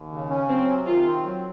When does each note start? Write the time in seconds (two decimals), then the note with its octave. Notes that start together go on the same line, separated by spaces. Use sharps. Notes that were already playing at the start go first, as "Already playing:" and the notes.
Already playing: D#2
0.12 C#3
0.30 C#4
0.49 F#3 C4
0.68 C3
0.87 D#3 F4
1.06 C4
1.24 F#3